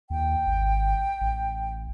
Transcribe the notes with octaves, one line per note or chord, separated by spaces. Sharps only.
D#2 G5
G#1
A1